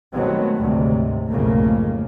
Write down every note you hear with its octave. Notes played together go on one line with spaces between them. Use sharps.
D#3 F#3 G#3 A3 B3 C4
D2 G#2 C3
B1 F2 G#2 C#3 A3 A#3